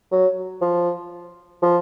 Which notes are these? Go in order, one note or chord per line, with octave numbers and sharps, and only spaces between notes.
F#3
F3
F3